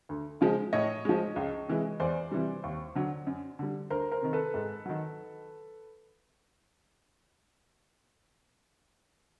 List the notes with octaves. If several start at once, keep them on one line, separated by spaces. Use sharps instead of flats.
D2
C#3 F3 G#3
A2 C#5 D#5
F3 G#3
C#2
C3 E3 G#3
E2 C5 D5
C3 E3 G3
D#2
D3 F#3
F#2
D3 G3
D2 A#4 C5
A#4 C5
C3 D#3
A4 B4
G#2
D#3 F#3